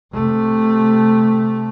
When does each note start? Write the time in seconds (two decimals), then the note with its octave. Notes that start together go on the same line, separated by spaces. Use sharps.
0.13 C3 A3